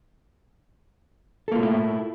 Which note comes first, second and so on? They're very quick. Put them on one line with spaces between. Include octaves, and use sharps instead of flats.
A4 A#3 F4 A3 E4